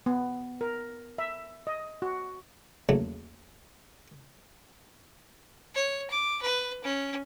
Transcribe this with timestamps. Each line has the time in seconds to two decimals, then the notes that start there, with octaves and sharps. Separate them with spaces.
0.06 B3
0.61 A#4
1.18 E5
1.67 D#5
2.02 F#4
2.89 A#1 E2 C#3 F#3 A3
5.75 C#5
6.10 D6
6.42 B4
6.84 C#4